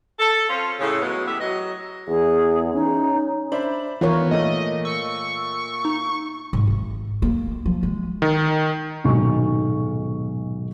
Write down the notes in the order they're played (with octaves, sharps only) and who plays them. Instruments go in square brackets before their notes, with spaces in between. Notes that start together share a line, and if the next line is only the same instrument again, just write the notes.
[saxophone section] A4
C4 C#4 F4
A2 C#3
F#3 G#3 B3
A2 E3 B3 G4 E5
F#3 D#5
[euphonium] E2 [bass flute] G#4
[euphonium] C#4 [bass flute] D#4
[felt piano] D4 C5 E5 [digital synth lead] B5
[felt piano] D#3 [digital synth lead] E3 [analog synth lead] B3 [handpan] F4 A#4 C#5
[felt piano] A#2 A3 [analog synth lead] D#5
[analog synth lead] C#6 [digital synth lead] E6
[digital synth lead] D#4
[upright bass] G#2
G#1
A#3
F3
G#3
[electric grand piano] D#3
[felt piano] D#1 B1 G#2 D#4 C#6